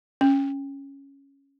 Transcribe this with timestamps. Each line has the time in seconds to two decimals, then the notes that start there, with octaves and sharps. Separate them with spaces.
0.21 C#4